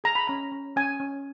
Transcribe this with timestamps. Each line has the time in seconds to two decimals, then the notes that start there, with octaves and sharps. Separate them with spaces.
0.04 G#4 A#5
0.15 B5
0.27 C#4 A#5
0.52 C#4
0.76 C#4 G#5
1.00 C#4